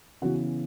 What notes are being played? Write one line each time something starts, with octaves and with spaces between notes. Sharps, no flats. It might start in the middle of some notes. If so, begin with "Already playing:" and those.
C#3 E3 B3 F#4